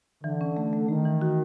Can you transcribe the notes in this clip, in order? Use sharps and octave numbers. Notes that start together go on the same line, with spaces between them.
D3 E3
C#4
A3
A3
D#3 A3
E3
F#4